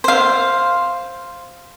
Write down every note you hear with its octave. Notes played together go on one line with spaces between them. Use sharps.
C5 F5